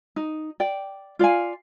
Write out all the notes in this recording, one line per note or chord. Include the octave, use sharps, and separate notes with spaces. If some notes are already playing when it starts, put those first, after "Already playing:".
D#4
D5 G5
F4 D5 F5 G#5